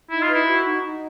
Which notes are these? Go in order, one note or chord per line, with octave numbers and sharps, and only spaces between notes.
D#4 E4
F4
B4
E4
F#4
D#4
D#4